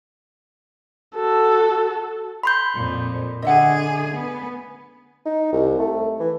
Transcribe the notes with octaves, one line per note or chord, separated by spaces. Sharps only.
F#4 A4
B5 C6 G6
F2 A#2
D3 G#4 D#5 E5 F#5
B3
D#4
C2
A3
E3